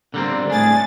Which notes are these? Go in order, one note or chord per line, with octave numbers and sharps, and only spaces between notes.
D3 G3 A#3 C4
A2 D4 G#4 A6